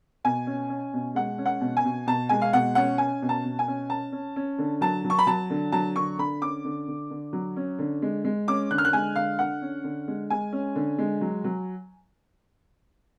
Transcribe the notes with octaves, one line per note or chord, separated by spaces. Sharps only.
B2 G#5
C#4
C#4
B2
G#3 F#5
C#4
F#5
B2
G#5
B2
B2 A5
G#3 G#5
F5
B2 F#5
C#4 F#5
C#4 G#5
B2
A5
B2
G#5
C#4
C#4 A5
C#4
C#4
D3
F#3 A5
F#3
C#6
B5
F#3 A5
D3
F#3 A5
D3 C#6
D3 B5
C#4 D6
D3
D3
D3
F#3
C#4
D3
G#3
G#3
C#4 D6
D3 F#6
F6
F#6
G#3 G#5
D3 F5
D3 F#5
C#4
D3
G#3
G#3 G#5
C#4
D3
G#3
F#3
F#3